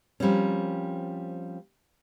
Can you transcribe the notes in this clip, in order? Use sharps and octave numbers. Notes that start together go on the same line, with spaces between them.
F3 G3 A#3 C4 C#4